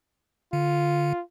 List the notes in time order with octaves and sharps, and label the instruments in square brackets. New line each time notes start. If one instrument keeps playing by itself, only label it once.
[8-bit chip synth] D3 [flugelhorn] F4